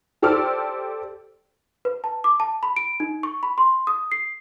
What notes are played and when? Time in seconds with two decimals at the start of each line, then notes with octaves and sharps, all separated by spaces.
0.22 G4 A4 C5 D5 E6 F6
1.85 B4
2.04 A5
2.24 D6
2.40 A5
2.63 B5
2.76 D7
3.00 D#4
3.23 C#6
3.43 B5
3.58 C6
3.87 D#6
4.12 C7